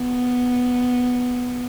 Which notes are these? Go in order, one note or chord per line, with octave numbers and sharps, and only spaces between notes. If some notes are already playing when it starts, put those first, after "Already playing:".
Already playing: B3